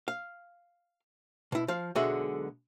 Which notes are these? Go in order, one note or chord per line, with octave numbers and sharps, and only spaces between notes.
F5
B2 E4
F3 F5
B1 D3 G#3 F#4 G#4 E5